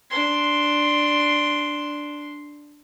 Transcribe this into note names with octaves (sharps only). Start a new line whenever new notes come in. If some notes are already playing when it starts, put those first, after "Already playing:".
D4 C6